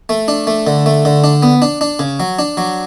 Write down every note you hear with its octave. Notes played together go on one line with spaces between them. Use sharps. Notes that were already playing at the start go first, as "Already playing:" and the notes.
A3
D4
A3
D3
A3
D3
D4
B3
D4
D4
C#3
F#3
D4
F#3